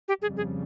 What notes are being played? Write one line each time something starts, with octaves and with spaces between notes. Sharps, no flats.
G4
F2 C#3 G3 G#4
G#4